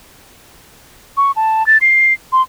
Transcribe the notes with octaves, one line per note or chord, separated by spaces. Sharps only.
C#6
A5
A6
C7
C6